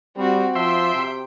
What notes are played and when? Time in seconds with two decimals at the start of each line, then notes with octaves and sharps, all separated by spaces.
0.17 G3 C4 F#4
0.55 F3 E5 G5 C6
0.95 C3